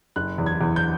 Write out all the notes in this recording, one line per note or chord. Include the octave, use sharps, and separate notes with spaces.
F#1 F#6
E2
G#6
E2
G6